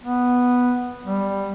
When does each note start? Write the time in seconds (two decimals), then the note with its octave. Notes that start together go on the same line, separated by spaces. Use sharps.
0.04 B3
1.06 G3